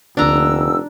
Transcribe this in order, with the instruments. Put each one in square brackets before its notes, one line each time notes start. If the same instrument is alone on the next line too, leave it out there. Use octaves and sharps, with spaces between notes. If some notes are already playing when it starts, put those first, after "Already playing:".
[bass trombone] F1 [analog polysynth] D2 D3 A#3 [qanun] D4 A#5 [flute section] E6